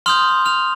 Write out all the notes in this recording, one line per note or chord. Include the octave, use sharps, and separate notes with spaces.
C6 D#6 F6 G6 F7
F6 F7